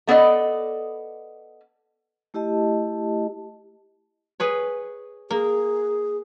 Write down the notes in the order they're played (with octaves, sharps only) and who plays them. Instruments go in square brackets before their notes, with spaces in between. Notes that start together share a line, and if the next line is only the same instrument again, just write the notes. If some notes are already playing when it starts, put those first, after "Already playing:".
[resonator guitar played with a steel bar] A3 B3 A4 D5 D#5
[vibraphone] A3 E4 G4 D#5 A5
[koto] G#4 B4 C#5
[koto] A#3 [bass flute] G#4